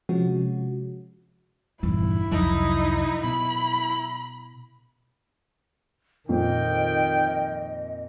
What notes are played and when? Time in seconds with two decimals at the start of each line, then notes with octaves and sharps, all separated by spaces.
0.09 C3 F3 G#3 C#4 F#4
1.83 A#1 E2 G2 D#4 E4
2.32 C2 F2 F#3 D#4
3.24 B2 B5
6.29 F2 A#2 D#3 D#5 G5